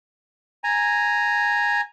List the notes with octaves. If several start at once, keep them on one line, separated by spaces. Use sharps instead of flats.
G#5 A#5